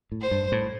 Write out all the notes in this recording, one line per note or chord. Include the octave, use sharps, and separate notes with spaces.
A2
C5
G2
A2